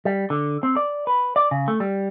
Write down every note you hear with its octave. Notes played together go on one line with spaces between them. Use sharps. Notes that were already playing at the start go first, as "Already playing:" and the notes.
G3
D3
C4
D5
B4
D5
C#3
A3
G3